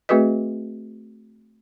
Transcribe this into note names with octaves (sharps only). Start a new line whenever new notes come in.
A3 C4 F#4 G#4 B4 D#5